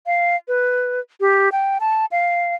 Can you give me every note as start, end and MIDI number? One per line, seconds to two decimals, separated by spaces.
0.06 0.36 77
0.48 1.00 71
1.21 1.49 67
1.52 1.78 79
1.80 2.05 81
2.11 2.55 77